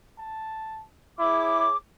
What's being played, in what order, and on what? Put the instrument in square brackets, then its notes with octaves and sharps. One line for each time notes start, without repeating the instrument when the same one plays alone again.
[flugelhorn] A5
[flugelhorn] E4 [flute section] G#4 C#5 D6